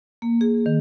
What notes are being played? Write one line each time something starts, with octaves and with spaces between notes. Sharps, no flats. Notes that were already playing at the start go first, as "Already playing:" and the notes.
A#3
G#4
D#3